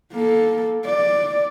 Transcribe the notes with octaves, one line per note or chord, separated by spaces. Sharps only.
A#3 A4
D5